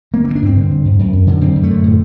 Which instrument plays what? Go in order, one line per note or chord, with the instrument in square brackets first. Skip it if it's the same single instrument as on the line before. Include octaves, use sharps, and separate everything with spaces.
[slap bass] D3 A#3
C4
G2
D4
G2 C4
D3
G2
G2
F#2
F#2
D3
F#2 C4
F#2
A3
D3
A2